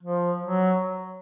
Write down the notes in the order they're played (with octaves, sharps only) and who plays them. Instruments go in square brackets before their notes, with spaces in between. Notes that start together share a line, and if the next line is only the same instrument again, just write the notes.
[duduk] F3
F#3